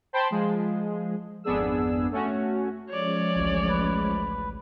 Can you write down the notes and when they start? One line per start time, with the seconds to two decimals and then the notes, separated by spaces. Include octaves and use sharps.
0.13 C5 G5 A5 B5 C6
0.30 F3 G#3 G#4
1.44 G#1 F2 B3 D4 G#4 E6
2.11 A3 C#4 F#4
2.90 F3 G#3 C#4 C#5 D5
3.35 A1 D2
3.69 B4